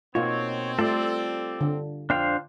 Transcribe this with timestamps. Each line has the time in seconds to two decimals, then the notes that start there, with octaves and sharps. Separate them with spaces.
0.15 B2 A#3 C4 D#4 F4 C#5
0.79 G3 A3 F4 A4 D5
1.61 D3
2.10 F2 D4 C5 F5 G5